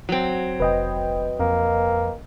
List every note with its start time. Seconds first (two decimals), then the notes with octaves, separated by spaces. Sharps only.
0.09 F#3 C4
0.60 F1 B4 D#5 G5
1.40 F2 A#3